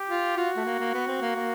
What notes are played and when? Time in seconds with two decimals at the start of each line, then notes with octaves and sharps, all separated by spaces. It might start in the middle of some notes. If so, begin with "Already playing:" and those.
Already playing: G4
0.10 F4
0.37 F4 F#4
0.57 A3
0.65 A#3
0.79 A#3
0.94 B3
1.08 C4
1.21 A#3
1.35 A#3